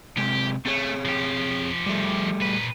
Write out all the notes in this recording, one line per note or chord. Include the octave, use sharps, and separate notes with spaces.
C3 G#3 C4 G4
A3 C4 G#4 C#5
F3 G4
G3 A3
A#2 B4